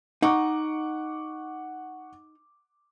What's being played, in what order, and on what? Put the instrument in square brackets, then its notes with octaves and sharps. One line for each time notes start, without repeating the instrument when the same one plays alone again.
[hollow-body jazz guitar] D#4 [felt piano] F#5 C#6 D6